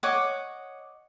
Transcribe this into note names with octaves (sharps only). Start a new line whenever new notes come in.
C#5 D#5 F#5 D6